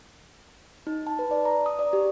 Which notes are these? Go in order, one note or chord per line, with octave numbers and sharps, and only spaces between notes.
D#4
A5
B4
D5
A#5
D#6
D5
G4